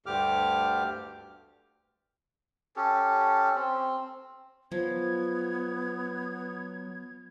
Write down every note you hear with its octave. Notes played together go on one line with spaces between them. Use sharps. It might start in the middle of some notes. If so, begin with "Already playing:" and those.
D2 G2 D3 G4 D6 F6
C#4 G4 A4
C4
F3 F#3 B3 G#6